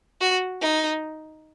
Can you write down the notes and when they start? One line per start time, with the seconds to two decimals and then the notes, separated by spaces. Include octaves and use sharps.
0.21 F#4
0.62 D#4